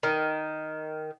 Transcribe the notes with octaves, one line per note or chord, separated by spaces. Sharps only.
D#3